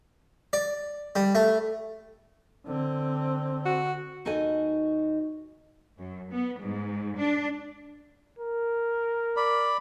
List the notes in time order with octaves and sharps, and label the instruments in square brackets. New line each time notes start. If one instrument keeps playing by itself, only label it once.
[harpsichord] D5
G3
A3
[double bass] D3 C4
[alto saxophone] F#4
[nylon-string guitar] D#2 D#4 F#4 A4 D#5 G#5
[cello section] F#2
B3
G#2
D4
[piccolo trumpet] A#4
[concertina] D5 B5